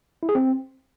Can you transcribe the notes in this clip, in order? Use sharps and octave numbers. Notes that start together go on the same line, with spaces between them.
E4
G#4
C4